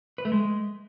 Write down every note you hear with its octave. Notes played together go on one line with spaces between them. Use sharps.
B4
A3
G#3